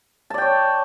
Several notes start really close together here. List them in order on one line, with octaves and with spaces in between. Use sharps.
A5 D5 G5 C#5